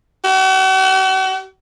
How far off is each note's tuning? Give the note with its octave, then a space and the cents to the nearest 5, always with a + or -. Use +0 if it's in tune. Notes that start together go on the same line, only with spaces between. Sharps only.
F#4 +45